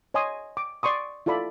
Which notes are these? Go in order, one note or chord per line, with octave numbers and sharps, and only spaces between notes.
C#5 D#5 G#5 C6 D#6
D6
D5 C6 C#6 D#6
E4 F4 A4 D5 B5